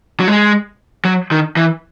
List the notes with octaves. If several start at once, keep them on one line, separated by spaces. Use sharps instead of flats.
F#3
G#3
F#3
D#3
E3